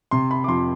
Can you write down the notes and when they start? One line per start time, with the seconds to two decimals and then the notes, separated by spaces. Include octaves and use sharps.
0.11 C3 C6
0.31 B5
0.44 D6
0.48 F2 C6